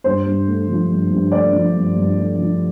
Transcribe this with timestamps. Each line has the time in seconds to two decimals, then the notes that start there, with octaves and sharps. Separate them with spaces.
0.04 G2 C5
0.26 G2
0.48 A3
0.68 F3
0.89 G2
1.10 G2
1.32 A3 D5
1.53 F3
1.74 G2
1.96 G2
2.17 A3
2.38 F3